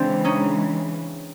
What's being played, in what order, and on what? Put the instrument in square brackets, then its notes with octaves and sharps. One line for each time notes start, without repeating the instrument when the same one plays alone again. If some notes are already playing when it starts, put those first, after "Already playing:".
Already playing: [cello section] C#3 E3 G#3 [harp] C4 D4
[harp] C#4 D#4